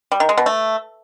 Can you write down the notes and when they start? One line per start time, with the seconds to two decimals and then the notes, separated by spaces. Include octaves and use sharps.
0.12 G3
0.20 D#3
0.29 G#3
0.38 B2
0.46 A3